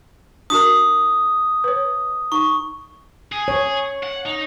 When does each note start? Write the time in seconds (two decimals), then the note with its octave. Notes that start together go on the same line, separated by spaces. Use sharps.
0.50 D4 F#4 A#4 D#6
1.64 B4 C#5
2.32 D#4 C#6
3.32 G#4
3.48 C#5
4.03 F#5
4.26 D#4